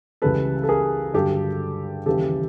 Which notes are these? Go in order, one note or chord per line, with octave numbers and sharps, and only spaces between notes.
C#2 C#3 E3 G3 A4 B4
A4
G#4 A#4
G2 D3 F#3 G4 A4
D#2 C#3 E3 G3 G4 A4